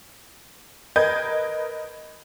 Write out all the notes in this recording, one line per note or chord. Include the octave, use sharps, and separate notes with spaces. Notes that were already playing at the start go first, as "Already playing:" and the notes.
A#4 B4 D#5 G6 G#6